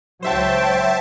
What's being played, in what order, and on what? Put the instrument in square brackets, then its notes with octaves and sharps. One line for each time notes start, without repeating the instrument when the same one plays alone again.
[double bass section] C#2 F#3 [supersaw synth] C5 E5 A5 [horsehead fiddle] C#5 G5